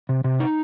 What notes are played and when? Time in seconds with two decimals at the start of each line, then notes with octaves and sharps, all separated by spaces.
0.09 C3
0.24 C3
0.40 D#4